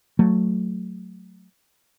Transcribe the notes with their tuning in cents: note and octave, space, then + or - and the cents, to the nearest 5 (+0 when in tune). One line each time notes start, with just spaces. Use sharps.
F#3 +0 A3 +0